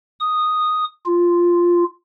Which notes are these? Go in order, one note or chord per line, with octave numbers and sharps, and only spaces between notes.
D#6
F4